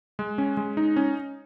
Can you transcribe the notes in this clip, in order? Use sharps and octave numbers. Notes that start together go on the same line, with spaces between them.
G#3
C#4
G#3
D#4
C#4